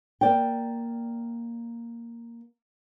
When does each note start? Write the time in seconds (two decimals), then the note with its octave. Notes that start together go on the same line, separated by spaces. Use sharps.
0.21 A#3 D5 G5